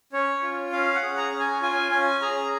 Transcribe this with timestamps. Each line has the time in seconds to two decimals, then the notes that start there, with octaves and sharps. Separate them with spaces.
0.13 C#4 C#5
0.43 F4
0.72 C#4 F5
0.95 F#5
1.03 G#4
1.17 A#5
1.32 C#4
1.39 G#5
1.62 F4 G#5
1.91 C#4 G#5
2.21 G#4 A#5